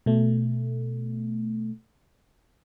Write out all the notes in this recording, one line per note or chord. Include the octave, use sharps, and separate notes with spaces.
B2 A3